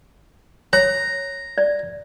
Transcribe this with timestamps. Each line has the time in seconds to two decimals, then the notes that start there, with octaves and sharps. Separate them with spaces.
0.73 C#5 A#5
1.58 D5